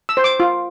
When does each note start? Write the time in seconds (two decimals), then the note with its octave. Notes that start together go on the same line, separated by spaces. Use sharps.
0.09 E6
0.17 C5
0.24 D6
0.40 F4